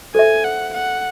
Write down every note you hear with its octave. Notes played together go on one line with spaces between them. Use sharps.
A4 C5 E5 G#5
F#5
F#5